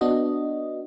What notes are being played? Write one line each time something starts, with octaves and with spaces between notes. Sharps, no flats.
B3 D4 F#4 D#5